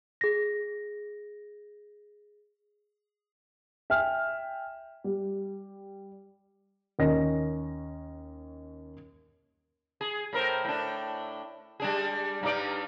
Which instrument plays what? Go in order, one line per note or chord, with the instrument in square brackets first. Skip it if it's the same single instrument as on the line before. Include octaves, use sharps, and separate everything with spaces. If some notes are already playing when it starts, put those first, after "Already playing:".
[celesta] G#4 A#6
[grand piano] E5 G5 G#5 F6
G3
D#2 C#4 A#4 D#5 A#6
[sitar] G#4
A2 A#4 C5
A2 D4
G3 D4 G#4
G2 D#4 D5